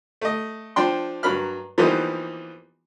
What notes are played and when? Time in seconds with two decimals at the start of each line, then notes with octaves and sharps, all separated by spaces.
0.21 A3 D#5
0.76 F3 D4 G5 C6
1.23 G2 F#3 A#4 B5 F6
1.78 E3 F3 G3 A#3 B3 D#4